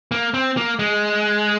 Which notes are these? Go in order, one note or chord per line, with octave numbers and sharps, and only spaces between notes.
A#3
C4
A#3
G#3